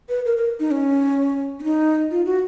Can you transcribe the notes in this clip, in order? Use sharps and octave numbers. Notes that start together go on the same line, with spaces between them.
B4
A#4
A#4
D#4
C#4
C#4
D#4
F4
F#4